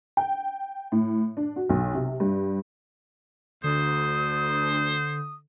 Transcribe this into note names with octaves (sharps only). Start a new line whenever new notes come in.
G5
A2
D4
F#4
B1
C3
G2
D2 D3 C5 D#6